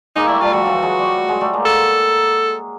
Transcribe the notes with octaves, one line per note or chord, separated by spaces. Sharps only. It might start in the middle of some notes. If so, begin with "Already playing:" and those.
G#3 A#3 D#4
G3 A3 E4
G3 A3 F4
F3 G3 F#4
E3 F#3
F#3 G#3
G3 A3
F#3 G#3
G3 A3
G#3 A#3
A4